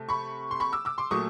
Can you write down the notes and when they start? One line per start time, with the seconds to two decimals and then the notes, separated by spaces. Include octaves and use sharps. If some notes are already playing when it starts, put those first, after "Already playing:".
Already playing: C3 A3
0.09 B5 C#6
0.51 C6
0.60 B5 C#6
0.72 D6 E6
0.85 D6 E6
0.98 C6 D6
1.11 A#2 F#3 A3 C#6 D#6